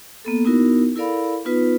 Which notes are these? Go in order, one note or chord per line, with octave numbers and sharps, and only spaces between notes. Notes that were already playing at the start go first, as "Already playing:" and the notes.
A#3 B3 A4
B3 D#4 E4 F#4 A#4
E4 A4 A#4 D5 F5 B5
B3 D#4 F4 B4